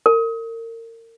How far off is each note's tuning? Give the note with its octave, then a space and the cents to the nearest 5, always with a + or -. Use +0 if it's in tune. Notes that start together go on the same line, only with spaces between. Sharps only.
A#4 -35